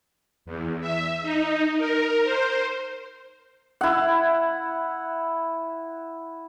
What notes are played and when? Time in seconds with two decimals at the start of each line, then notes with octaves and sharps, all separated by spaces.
0.46 E2
0.81 E5
1.22 D#4
1.78 A#4
2.23 C5
3.81 E4 F#5